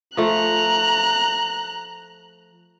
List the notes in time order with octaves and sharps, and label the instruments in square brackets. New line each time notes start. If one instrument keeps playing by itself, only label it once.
[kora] F3 A3 [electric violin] A#5 F#6